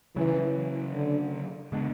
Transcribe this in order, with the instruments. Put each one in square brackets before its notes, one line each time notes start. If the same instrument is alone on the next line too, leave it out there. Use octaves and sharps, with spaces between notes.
[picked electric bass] C#3 F#3 C#4 [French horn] E3
[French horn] D3
[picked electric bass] C#3 G#3 B3 D4